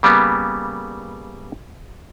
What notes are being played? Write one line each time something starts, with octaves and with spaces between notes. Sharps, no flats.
C#3 G3 A#3 B3